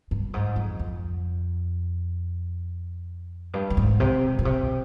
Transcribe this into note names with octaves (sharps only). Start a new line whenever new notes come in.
G2
G#2
F2
F2
G2
G2
G#2
C3
A#2
C3